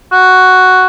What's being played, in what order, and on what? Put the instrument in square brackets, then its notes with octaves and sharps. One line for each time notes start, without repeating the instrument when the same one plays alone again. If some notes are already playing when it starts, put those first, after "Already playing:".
[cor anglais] F#4